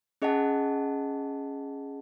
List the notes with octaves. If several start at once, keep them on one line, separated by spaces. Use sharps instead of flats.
C#4 G#4 D#5 F#5 A5